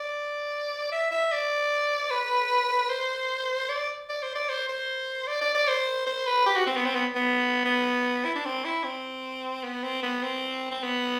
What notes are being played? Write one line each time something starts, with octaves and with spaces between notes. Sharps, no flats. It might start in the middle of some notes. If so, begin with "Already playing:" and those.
Already playing: D5
E5
E5
D5
B4
C5
D5
D5
C5
D5
C5
C5
D5
D5
D5
C5
C5
B4
G4
F#4
C4
B3
C4
B3
B3
B3
E4
D4
C4
E4
C4
B3
C4
B3
C4
C4
B3